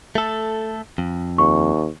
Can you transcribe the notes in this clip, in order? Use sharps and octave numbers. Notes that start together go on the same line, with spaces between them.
A3 A4
F2
D#2 C#6